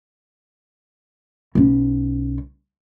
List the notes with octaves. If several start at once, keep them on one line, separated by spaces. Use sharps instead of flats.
B1 C#4